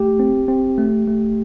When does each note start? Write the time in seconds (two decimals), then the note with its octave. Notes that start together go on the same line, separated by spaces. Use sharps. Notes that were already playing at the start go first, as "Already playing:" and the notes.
Already playing: A3 G4
0.19 C4
0.48 C4
0.78 A3
1.08 A3